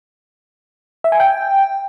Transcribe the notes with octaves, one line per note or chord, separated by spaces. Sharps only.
E5
G#5
G5